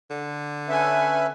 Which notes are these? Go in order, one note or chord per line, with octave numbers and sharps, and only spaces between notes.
D3
C#4 A4 B4 E5 G#5